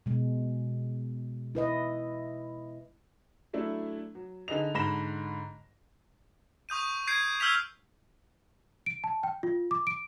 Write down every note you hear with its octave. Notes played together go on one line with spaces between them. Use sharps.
B2 G#3
E4 B4 D#5
F#3 A3 D4 E4
F#3
D3 D#4 G#4 B4 D#5 F7
G#2 D3 B5 A#6 E7 G7
C#6 D#6 G6 D#7
G6 G#6 C7 D7 D#7
E6 F6 G6 G#6 B6 F7
D7
A5
G5
F4
D6
D7